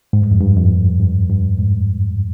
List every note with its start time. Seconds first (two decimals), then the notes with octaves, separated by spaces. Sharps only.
0.13 G#2
0.22 G2
0.31 F2
0.41 G2
0.57 F2
1.00 G2
1.29 G2
1.58 G#2